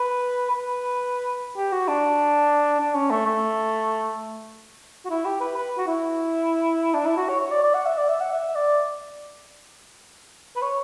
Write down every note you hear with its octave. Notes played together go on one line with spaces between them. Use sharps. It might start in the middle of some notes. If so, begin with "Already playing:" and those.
Already playing: B4
B4
G4
F#4
D4
D4
C#4
A3
A3
F#4
E4
G4
B4
B4
F#4
E4
D4
E4
F#4
C#5
C#5
D5
D5
F#5
E5
D5
E5
F#5
E5
D5
B4
C#5